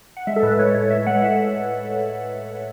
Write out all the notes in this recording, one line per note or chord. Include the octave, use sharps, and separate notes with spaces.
F#5
G#3 E5
A4
A2 B4
B4
G#3 C#5
A2 C#5
A2 E5
G#3 F#5
A2 E5